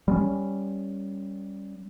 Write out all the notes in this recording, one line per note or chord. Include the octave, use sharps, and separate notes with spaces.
G3 G#3 C#4